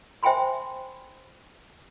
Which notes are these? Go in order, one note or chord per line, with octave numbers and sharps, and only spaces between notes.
C5 E5 G5 G#5 B5 C6